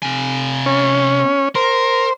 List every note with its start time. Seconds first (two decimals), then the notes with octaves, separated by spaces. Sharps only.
0.02 C3 G#5
0.66 C#4
1.55 A#4 C5